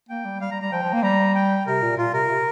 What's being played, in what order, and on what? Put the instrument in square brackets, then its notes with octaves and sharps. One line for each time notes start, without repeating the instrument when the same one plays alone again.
[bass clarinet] A#3 [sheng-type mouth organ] G5
[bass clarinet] G3
[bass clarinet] G3 [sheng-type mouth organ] F5
[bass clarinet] G3 [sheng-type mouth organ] A#5
[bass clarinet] G3 [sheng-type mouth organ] A#5
[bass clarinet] F3 [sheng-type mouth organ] G5
[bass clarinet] F3
A#3
[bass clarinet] G3 [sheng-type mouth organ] A#5
[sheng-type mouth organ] G5
[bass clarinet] C3 [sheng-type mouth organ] A#4
[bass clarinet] A#2
[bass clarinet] A#2 [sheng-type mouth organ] F4
[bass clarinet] C3 [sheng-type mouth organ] A#4
[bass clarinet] C3